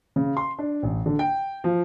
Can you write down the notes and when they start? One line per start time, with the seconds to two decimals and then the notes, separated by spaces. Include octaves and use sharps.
0.16 C#3
0.37 C6
0.59 D4
0.83 A1
1.06 D3
1.19 G5
1.64 F3